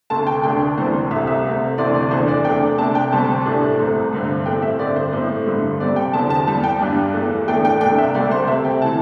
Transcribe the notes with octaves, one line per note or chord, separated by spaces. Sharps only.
D2 C3 A3 A5
G5
D2 D3 A3 D4 G5
D2 C3 E3 G3 D4 C5
C2 C3 A3 E5
E5
C3 A3 C4
D2 C3 E3 C4 D5
D5
E2 E3 A3 D4 C5
D5
C3 A3 D4 G5
C3 A3 D4 A5
G5
D2 C3 G3 C4 A5
A2 A3 D4
C2 C3 A3 C4
G2 D3 G3 C4
A2 A3 C4 G5
E5
G2 D3 C4 D5
C5
A2 G3 C4
G2 D3 G3
C3 G3 C4 D5
G5
E2 D3 C4 A5
A5
E2 E3 G3 A5
G5
G2 G3 D4
E2 E3 A3
A2 E3 A3 D4 G5
G5
C2 C3 A3 D4 G5
E5
D2 C3 G3 D5
C5
C3 A3 C4 E5
G5
C3 E3 A5